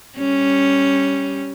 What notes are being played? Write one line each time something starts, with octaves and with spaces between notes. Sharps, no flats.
G3 C#4